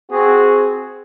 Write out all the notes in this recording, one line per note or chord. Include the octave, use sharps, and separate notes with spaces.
C4 F#4 G#4